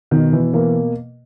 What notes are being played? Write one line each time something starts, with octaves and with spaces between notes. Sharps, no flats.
B2 D#3
E3
E3 A#3